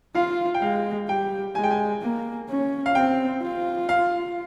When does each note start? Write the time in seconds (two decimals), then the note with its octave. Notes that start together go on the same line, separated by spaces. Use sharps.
0.15 F4 F5
0.54 G5
0.61 G#3 F5
1.08 G3 G5
1.55 G#3 G#5
1.64 G5
1.71 G#5
2.02 A#3
2.49 C#4
2.86 F5
2.95 C4 G5
3.42 F4
3.89 F5